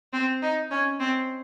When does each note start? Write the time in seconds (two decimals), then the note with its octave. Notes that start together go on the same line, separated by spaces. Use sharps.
0.13 C4
0.42 D#4
0.71 C#4
1.00 C4